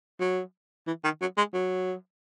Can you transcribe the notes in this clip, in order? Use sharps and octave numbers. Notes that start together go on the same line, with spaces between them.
F#3
E3
D#3
F#3
G#3
F#3